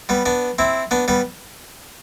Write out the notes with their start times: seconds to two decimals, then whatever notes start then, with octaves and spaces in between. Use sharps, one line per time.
0.09 G3 B3
0.26 B3 D4
0.58 C4 E4
0.91 B3 D4
1.08 G3 B3